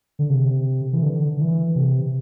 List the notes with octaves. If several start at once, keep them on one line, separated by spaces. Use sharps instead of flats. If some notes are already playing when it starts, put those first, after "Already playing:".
D3
C3
E3
D3
E3
C3